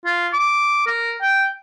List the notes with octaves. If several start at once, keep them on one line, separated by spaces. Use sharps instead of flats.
F4
D6
A#4
G5